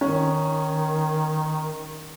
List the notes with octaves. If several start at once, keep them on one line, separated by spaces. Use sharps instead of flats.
D#3 C#4